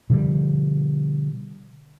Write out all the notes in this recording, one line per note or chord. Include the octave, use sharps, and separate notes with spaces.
B2 D3 F3 G3